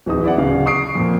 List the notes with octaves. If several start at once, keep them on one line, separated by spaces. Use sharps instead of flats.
D1 E2 D#4 D#6
E4 D5 F#5
D1 C#3 F5
C#6 D#6 C7 D7
F2 A#2 F3